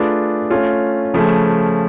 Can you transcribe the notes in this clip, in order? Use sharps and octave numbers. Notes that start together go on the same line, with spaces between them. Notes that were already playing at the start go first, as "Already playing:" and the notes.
Already playing: A3 D4 F4 G#4 B4
A3 C#4 F4
C#3 F3 A3 C#4